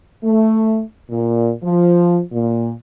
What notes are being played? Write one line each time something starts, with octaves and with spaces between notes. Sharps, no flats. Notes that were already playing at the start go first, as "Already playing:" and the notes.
A3
A#2
F3
A#2